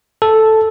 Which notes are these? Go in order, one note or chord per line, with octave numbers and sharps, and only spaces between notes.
A4